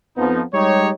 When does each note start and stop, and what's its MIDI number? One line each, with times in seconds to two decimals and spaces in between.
0.17 0.42 41
0.17 0.42 53
0.17 0.42 59
0.17 0.42 63
0.54 0.90 55
0.54 0.90 56
0.54 0.90 63
0.54 0.90 67
0.54 0.90 73